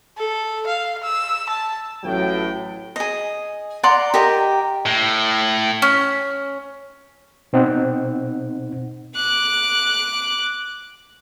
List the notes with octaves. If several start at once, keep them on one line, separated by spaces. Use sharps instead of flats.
A4
F5
E6
A5
A1 A2 F#3 G5
G#4 D#5
D5 F#5 A#5 C6
G4 A#4 D#5 A#5
A2
C#4
B2 C4 D#4 F#5
D6 F#6